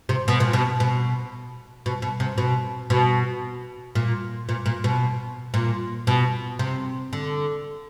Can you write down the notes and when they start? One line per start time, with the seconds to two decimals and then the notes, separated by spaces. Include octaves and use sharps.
0.09 C3
0.28 B2
0.40 A#2
0.53 B2
0.80 B2
1.86 B2
2.02 B2
2.20 C3
2.38 B2
2.90 B2
3.95 A#2
4.49 A#2
4.66 A#2
4.84 B2
5.54 A#2
6.07 B2
6.59 C3
7.13 D3